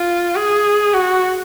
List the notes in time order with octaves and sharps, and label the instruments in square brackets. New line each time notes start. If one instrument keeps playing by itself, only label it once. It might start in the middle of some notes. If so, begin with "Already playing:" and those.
Already playing: [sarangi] F4
G#4
F#4